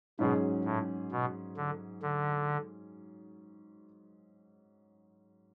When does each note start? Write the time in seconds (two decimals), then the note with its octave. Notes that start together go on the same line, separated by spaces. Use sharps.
0.19 G#2 B2 F#3 C#4 G#4
0.65 A2
1.11 B2
1.57 D3
2.02 D3